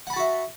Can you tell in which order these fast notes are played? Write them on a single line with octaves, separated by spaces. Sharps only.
F#5 B5 A5 F#4 E5